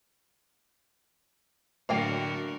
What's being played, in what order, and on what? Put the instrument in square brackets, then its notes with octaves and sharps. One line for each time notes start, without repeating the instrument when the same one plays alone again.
[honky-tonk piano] A2 F#3 [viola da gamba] D3 F#4 A#4 [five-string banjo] A#3 F5 G5